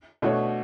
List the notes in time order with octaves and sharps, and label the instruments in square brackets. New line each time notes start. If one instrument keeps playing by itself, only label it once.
[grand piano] B2 A3 D4 F#4 C#5